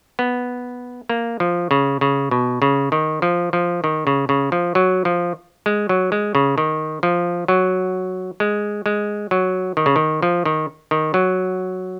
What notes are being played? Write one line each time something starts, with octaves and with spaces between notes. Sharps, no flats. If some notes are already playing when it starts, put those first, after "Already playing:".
B3
A#3
F3
C#3
C#3
B2
C#3
D#3
F3
F3
D#3
C#3
C#3
F3
F#3
F3
G#3
F#3
G#3
C#3
D#3
F3
F#3
G#3
G#3
F#3
D#3
C#3
D#3
F3
D#3
D#3
F#3